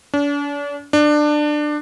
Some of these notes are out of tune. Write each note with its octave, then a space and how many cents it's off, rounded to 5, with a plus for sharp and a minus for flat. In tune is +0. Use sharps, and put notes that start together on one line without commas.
D4 -40
D4 +20